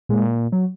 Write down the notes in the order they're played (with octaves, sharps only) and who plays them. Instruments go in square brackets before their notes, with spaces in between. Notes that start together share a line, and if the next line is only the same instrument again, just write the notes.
[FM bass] A#2 [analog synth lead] G#3
[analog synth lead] F#3